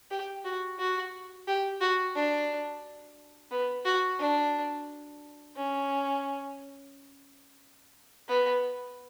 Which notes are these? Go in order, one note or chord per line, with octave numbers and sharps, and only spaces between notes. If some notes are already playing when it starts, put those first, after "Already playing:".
G4
F#4
F#4
G4
F#4
D4
B3
F#4
D4
C#4
B3